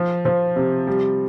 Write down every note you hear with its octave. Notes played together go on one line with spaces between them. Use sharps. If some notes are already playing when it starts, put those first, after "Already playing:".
Already playing: F3
F3
C3
G3